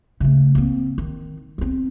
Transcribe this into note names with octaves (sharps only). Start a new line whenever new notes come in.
C#3 A3
A#3 C4
D#3
B3 C4